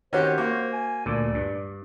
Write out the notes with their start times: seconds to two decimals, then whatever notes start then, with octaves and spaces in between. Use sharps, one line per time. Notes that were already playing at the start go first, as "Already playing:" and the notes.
0.13 D#3 C#4 F#4 G4 C5
0.38 A#3 F#4
0.73 G#5
1.06 D2 A#2 A4 D5
1.35 G2